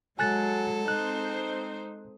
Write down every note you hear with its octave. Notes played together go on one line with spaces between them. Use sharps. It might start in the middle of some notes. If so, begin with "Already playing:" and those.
F#3 G#3 A4 G#5 F#6 A6
G#3 C4 D#4 C5 F#6